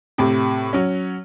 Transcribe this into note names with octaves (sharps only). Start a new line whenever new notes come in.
A2 C3
F#3 C#4